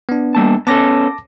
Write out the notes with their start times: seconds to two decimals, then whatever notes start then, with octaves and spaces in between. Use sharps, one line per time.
0.09 B3 D4
0.35 G3 A#3 A5
0.67 B3 C#4 A4 A5 D6 A#6